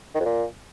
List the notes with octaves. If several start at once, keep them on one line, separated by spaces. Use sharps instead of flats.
D#3
F2
A#2